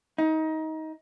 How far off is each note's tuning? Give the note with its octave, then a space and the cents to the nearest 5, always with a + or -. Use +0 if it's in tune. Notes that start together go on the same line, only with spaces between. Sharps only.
D#4 +25